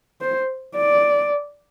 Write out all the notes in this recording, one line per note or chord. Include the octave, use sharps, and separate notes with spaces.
C5
D5